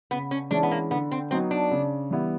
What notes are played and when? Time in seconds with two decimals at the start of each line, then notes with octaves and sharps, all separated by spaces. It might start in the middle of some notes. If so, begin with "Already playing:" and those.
0.11 C#3 B3
0.31 C#4
0.51 E3 G#3 C#4 D4 E4
0.63 B3
0.71 A#3
0.91 D3 B3
1.11 C4
1.31 F#3 B3 C4 D#4
1.51 D4
1.71 C#3
2.11 E3 G3 B3 E4